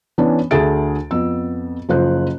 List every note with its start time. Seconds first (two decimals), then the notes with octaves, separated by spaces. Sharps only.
0.18 E3 B3 C#4 D4
0.51 D2 G#4 A4 E5 A6 D7
1.11 F2 B3 E6
1.89 F#1 F3 C5 F#6